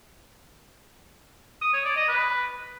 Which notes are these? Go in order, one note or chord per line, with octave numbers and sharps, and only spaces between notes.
D#6
C#5
D5
D#5
B4